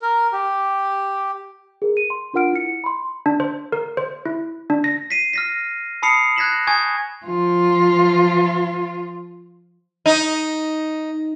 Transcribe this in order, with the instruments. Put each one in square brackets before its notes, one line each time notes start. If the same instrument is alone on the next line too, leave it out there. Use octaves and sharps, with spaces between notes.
[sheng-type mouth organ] A#4
G4
[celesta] G#4 A#4
D#7
C6
D4 F4 A#4 F#5 F6 D7
E4 C#7
B5 C6
[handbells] D4
C5
A#4
C5
E4
D4
A#6
[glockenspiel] B6 C7 D#7
F6 A#6 B6
A5 B5 D#6 C7 C#7 F7
F#6 G#6 A#6 B6 E7 F#7
G#5 C#6 D#6 G6 G#6 A#6
[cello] F3 F4
[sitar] D#4